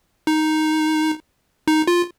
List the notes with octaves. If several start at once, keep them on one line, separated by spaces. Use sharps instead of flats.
D#4
D#4
F4